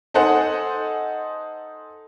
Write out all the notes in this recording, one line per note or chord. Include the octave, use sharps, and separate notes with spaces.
D#4 A4 C5 F#5 G#5